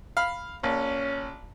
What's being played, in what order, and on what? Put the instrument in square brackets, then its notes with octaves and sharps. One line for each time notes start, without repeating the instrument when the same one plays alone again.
[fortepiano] F5 B5
[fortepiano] A#1 [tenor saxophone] C#4